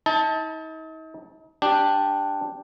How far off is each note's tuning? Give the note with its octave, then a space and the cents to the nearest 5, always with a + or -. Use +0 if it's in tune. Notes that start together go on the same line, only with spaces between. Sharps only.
D#4 +40 A5 +0
D4 +0 G4 +0